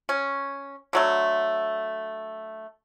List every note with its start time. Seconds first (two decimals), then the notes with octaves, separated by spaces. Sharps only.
0.09 C#4
0.93 D3 F#3 A3